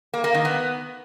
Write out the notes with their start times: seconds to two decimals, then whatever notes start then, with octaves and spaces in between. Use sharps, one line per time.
0.14 A#3
0.24 A#3
0.34 D#3
0.45 B3